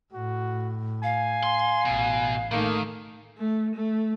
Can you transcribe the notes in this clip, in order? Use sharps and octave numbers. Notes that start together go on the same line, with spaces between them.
A2 F#4
F5 G#5
C6
A1 B2
D#3 A3 A#3 D#4
A3
A3